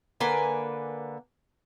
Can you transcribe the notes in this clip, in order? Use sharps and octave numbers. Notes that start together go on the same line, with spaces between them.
D3 A#3 B4 G#5